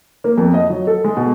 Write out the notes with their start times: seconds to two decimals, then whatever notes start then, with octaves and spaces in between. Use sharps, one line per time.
0.24 A#3
0.38 F2
0.54 D#5
0.70 F#3
0.87 A4
1.04 G#3
1.17 B2